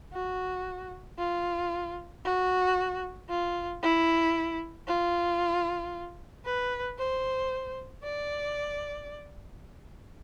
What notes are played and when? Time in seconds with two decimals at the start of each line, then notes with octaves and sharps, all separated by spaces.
0.14 F#4
1.19 F4
2.25 F#4
3.29 F4
3.82 E4
4.87 F4
6.45 B4
6.98 C5
8.03 D5